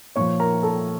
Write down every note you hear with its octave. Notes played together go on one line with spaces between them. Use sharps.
A#2 F3 C#5 C#6
A#4 A#5
A4 A5